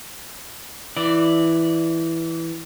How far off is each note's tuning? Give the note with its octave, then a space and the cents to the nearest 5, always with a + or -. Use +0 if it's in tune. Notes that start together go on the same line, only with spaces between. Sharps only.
E3 +0 D5 +0